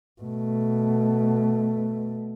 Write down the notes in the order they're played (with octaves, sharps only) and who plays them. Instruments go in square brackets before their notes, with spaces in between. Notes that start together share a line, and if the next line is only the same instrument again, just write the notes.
[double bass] B2 A3